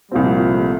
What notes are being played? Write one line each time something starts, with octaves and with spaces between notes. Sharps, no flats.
C2 A#2 F3 G3 C4
A3